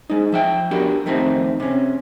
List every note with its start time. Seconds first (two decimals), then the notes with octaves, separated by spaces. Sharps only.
0.10 G#3 D#4
0.32 F3 E5 G5
0.71 B3 D4 F#4 G4 A#4
1.06 F2 D#3 A3 C4 D#4
1.60 C3 C#4